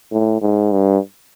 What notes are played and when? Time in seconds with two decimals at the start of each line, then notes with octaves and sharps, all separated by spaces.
0.12 A2
0.41 G#2
0.72 G2